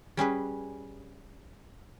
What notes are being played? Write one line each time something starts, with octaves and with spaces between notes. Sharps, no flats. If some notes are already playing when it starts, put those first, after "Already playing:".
G3 C#4 G#4 B4